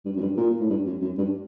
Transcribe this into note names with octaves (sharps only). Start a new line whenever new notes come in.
G2
F#2
G2
A#2
A2
G2
F#2
F#2
G2